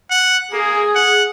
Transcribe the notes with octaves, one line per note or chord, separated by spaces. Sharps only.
F#5
A#3 G#4
F#5